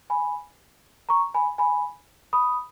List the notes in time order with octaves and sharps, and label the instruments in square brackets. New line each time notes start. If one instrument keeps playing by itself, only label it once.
[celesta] G#5 B5
A#5 C#6
G#5 B5
G#5 B5
B5 D#6